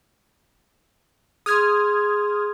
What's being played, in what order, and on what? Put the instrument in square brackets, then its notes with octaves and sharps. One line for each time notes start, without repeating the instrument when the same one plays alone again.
[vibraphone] G#4 C6 [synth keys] D#6 F6 G#6